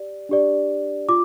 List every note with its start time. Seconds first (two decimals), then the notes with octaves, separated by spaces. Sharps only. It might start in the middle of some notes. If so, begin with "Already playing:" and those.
Already playing: G4 D5
0.29 D4 G4 D5
1.09 F4 D6